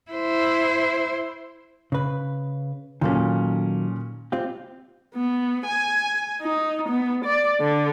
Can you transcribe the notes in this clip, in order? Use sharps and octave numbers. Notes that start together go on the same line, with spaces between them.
E4 C5
C#3 B4
A#2 D#3 F#3 C#4 A4
C4 F4 G4
B3
G#5
D#4
B3
D5
D3